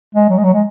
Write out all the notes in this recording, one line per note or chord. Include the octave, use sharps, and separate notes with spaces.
G#3
F#3
G#3
F#3
G#3